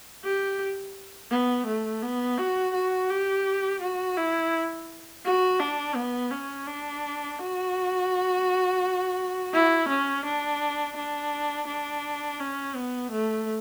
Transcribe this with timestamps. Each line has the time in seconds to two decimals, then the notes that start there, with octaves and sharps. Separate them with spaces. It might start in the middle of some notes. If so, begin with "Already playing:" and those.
0.24 G4
1.31 B3
1.66 A3
2.02 B3
2.38 F#4
2.74 F#4
3.10 G4
3.81 F#4
4.17 E4
5.25 F#4
5.60 D4
5.96 B3
6.31 C#4
6.67 D4
7.39 F#4
9.53 E4
9.89 C#4
10.26 D4
10.97 D4
11.67 D4
12.40 C#4
12.76 B3
13.11 A3